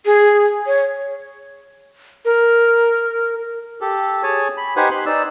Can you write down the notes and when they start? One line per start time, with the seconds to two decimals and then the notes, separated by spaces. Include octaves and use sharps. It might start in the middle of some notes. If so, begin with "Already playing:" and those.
0.05 G#4
0.67 C#5
2.25 A#4
3.81 G4 A4
4.23 G#4 C#5 G#5 A5
4.57 B5
4.76 D#4 G4 B4 C5 F#5 G#5
4.91 B4 B5 C6
5.06 D#4 D5 E6